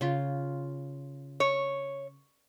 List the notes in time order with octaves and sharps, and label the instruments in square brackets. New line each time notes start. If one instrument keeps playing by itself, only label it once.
[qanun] C#3 F4
[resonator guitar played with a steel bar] C#5